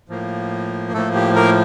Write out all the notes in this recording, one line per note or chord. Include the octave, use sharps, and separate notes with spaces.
A2 F3 A#3
A2 F3 A3 A#3 A4
G4
A#3 A#4